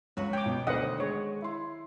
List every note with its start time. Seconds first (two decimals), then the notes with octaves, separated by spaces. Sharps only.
0.17 C#2 F#3 F#4 B4
0.33 C#5 G5 D6
0.46 B2
0.67 D2 D#3 C5 D#5 F#5
1.00 G#3 C#5
1.42 E4 C6